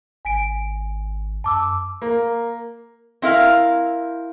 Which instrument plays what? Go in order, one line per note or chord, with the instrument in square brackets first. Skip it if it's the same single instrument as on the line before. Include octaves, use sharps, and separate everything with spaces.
[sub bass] G#1 [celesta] G#5 B6 D7
[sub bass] F#2 [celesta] A5 D6 E6
[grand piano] A#3
[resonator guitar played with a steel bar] C4 E4 A#4 F5